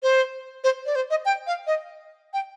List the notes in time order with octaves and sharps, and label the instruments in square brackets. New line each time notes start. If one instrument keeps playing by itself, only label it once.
[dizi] C5
C5
D5
C5
D#5
G5
F5
D#5
G5